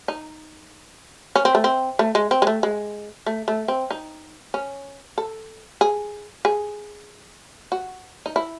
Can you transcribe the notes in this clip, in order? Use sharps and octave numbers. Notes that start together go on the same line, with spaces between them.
D#4
C#4
C4
A3
C4
A3
G#3
C4
G#3
A3
G#3
A3
A3
C4
D#4
C#4
A4
G#4
G#4
F#4
D#4
E4